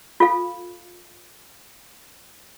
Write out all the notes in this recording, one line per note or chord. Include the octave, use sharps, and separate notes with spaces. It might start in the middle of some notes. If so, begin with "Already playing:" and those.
F4 A4 F5